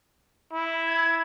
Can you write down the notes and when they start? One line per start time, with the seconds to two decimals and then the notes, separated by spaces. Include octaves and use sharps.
0.53 E4
0.87 G#6